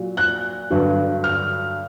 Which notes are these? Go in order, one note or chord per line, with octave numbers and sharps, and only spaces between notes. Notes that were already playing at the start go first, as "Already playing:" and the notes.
Already playing: A#2 F#3
F#6
G2 D3 F#3
F6